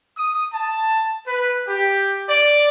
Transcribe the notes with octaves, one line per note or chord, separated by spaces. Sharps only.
D#6
A5
B4
G4
D5